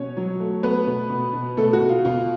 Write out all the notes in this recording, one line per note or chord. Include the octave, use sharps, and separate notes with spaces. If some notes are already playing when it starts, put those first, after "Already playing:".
Already playing: B2 C#4 C#5
F#3
A3
A3 B3 B4
B2
B2
B2
B2 A3 A4
F#4
B2
F4
B2 F4